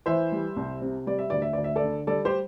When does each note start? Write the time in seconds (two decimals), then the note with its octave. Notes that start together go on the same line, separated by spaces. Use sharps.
0.06 E3 C5 E5
0.32 G3
0.56 C2
0.82 C3
1.07 G3 D5
1.19 E5
1.30 D2 D5
1.42 E5
1.53 D2 D5
1.64 E5
1.76 A4 D5
1.83 D3
2.07 G3 A4 D5
2.25 G4 C5